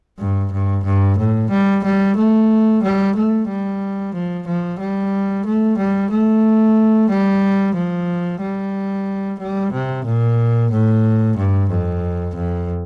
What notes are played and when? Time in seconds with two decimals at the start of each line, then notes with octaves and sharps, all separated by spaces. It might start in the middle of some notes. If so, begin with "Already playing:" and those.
0.19 G2
0.52 G2
0.84 G2
1.18 A2
1.50 G3
1.84 G3
2.16 A3
2.83 G3
3.15 A3
3.48 G3
4.14 F3
4.47 F3
4.80 G3
5.46 A3
5.78 G3
6.11 A3
7.10 G3
7.75 F3
8.41 G3
9.39 G3
9.73 C3
10.05 A#2
10.71 A2
11.37 G2
11.70 F2
12.35 F2